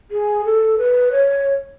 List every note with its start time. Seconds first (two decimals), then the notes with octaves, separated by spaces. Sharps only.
0.11 G#4
0.45 A4
0.78 B4
1.12 C#5